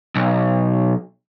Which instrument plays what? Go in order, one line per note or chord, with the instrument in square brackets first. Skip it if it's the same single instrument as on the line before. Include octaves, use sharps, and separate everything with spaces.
[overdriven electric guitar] B1